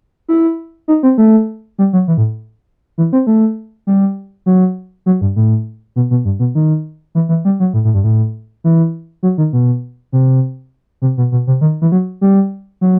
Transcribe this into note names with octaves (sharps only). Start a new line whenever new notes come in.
E4
D#4
C4
A3
G3
F#3
E3
A2
E3
C4
A3
G3
F#3
F#3
G2
A2
B2
B2
G2
B2
D#3
E3
E3
G3
F#3
A2
A2
G2
A2
E3
F#3
D#3
B2
C3
C3
B2
B2
C3
D#3
E3
F#3
G3
F#3